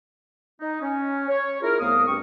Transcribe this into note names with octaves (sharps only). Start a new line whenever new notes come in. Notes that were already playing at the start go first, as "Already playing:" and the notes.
D#4
C#4
C#5
E4 F4 G#4 A#4
C2 A3 B3 F5 D#6
G2 C4 G4 C#6